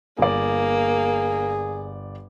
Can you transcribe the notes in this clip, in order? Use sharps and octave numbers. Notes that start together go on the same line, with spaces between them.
G1 A#3 G#4 D5